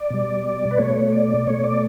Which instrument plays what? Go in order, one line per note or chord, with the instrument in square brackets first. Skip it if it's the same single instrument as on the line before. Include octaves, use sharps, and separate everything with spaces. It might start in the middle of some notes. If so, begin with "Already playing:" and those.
Already playing: [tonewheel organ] D5
B2 G3
B4
B2 A3 C#5
D5
B2 A3 C#5
D5